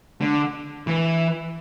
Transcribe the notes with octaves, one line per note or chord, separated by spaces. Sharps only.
D3
E3